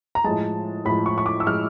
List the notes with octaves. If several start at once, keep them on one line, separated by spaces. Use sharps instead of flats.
A#5
A2 F3 G#3 A5
A2 F3 G#3 B5
C#6
C#6
D6
E6
A2 F3 G#3 F6